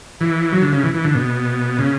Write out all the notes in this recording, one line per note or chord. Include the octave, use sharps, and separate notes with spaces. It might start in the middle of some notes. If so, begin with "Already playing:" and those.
E3
F#3
D3
C#3
E3
E3
D3
B2
C#3